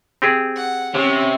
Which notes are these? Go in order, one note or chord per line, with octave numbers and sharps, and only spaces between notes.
C4 G4 G#4
F#5
C3 C#4